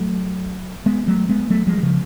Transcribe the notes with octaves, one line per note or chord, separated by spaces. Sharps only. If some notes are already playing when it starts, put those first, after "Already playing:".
Already playing: F#3 A3
G#3 B3
F#3 A3
G#3 B3
F#3 A3
F3 G#3
F#3
C#3 F3